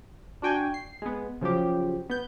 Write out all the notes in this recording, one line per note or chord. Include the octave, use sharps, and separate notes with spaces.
D4 F#4 G5 G#5
C7
G#3 B3
C#3 F3 F#3 G4
B3 G6